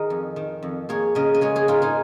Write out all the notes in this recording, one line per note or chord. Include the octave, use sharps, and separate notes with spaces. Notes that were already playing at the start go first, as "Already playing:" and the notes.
Already playing: D#3 G#4 A#4 D#5
F2
D#3
F2
A#3 G#4 C#5
C#3 A#4 D#5
D#5
G#3 G#4 C#5
G#4 C#5
G#2 F4 A#4
D#4 G#4